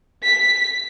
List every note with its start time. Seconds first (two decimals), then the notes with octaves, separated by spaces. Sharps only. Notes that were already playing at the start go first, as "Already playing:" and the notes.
0.24 B6